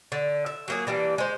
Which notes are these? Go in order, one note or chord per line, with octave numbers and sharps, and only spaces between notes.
D3
E5
F#3 A#3 G#4
E3 G3 A#3 D4
G#3 C5